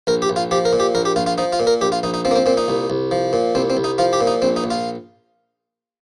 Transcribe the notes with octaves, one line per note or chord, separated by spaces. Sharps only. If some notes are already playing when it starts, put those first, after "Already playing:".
A#1 A#4
G4
A#1
F4
F3 G4
A#4
A#2
G4
A#1 A#4
G4
A#1 F4
F4
F3 D#4
F4
A#2
A#4
A#1 G4
F4
A#1 D#4
D#4
F3 C4
A#3
C4
A#2 C4
D#4
C2
C2
F3
A#2
C2 C4
C4
C2
D#4
F3 F4
G4
A#2
D#4
A#1 C4
D#4
A#1
F4